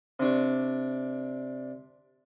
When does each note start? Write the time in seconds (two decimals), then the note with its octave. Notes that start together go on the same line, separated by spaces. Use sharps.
0.20 C3 D4 C#6